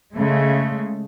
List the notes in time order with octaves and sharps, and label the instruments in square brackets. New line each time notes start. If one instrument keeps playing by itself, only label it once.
[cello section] C#3 G#3 A3